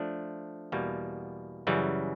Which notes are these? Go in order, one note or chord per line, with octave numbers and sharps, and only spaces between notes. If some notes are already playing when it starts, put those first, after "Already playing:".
Already playing: F3 A3 D4
E2 B2 G3 A#3
F#2 C#3 E3 G3